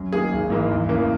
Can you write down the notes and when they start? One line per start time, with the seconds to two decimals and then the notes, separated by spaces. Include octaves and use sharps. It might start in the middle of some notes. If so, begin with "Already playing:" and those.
Already playing: F#2
0.12 D#3 A#3 G#4
0.32 G#1
0.50 G#2 E3 A#3
0.70 E2
0.89 C#3 E3 A#3